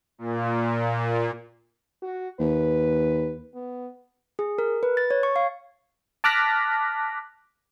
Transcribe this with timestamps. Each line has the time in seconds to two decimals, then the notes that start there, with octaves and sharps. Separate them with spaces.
0.18 A#2
2.02 F#4
2.40 D#2 B4
3.54 B3
4.39 G#4
4.58 A#4
4.83 B4
4.97 A6
5.11 C#5
5.23 C#6
5.36 F5
6.24 A5 D6 F6 F#6 A#6 B6